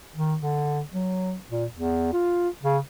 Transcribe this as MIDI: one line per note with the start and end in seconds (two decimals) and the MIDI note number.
0.16 0.35 51
0.40 0.81 50
0.93 1.35 54
1.49 1.65 46
1.73 2.09 40
2.13 2.49 65
2.63 2.78 49